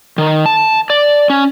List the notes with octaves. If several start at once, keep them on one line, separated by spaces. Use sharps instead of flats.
D#3
A5
D5
C#4